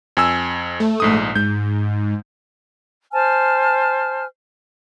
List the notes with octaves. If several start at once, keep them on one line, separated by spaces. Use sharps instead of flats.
F2 G#5 E6
A3
A#1 G#2 D#6
G#2 G6
C5 G#5 A5 F6